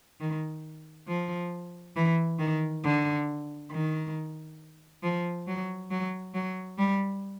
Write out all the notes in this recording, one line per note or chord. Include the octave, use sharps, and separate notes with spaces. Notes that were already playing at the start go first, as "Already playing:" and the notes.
D#3
F3
E3
D#3
D3
D#3
F3
F#3
F#3
F#3
G3